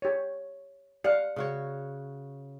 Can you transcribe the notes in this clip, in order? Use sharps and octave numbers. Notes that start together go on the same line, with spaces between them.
G4 C#5
G4 D5 F5 F#5
C#3 F#4 C#5